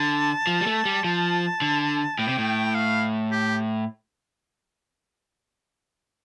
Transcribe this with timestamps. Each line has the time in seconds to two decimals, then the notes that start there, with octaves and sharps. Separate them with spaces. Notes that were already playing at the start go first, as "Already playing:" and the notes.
Already playing: D3 A5
0.47 F3
0.61 G3
0.67 A3
0.85 G3
1.04 F3 A5
1.62 D3
2.18 A2 G5
2.29 C3
2.38 A2
2.75 F5
3.32 G4